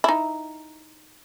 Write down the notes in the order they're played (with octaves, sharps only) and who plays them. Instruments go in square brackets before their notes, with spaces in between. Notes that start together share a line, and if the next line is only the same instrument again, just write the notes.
[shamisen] D#4 E4